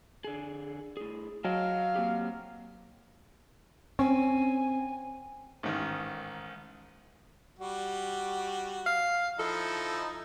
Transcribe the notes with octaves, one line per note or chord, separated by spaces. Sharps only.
D3 G#4
A2 G#4
F#3 D#5 F5 G5 A5
A#3 C4 G4
C4 C#4 G#5
A1 G#2 D#3
G3 F#4
F5
F3 D#4 E4 A4